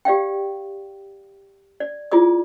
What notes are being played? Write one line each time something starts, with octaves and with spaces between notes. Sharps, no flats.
G4 D5 F5 G5
D5
E4 F4 G#4 D5 D#6